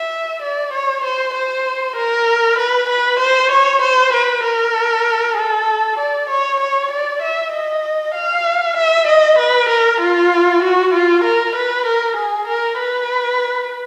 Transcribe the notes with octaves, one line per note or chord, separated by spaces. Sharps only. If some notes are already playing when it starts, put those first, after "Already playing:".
Already playing: E5
D5
C#5
C5
C5
A#4
B4
B4
C5
C#5
C5
B4
A#4
A4
D5
C#5
C#5
D5
E5
D#5
F5
E5
D#5
B4
A#4
F4
F#4
F4
A#4
B4
A#4
G#4
A#4
B4